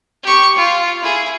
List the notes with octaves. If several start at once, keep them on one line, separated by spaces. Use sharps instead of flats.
G4 C#6
F4
E4 G#4